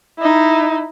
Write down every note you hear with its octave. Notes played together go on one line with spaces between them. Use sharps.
D#4 E4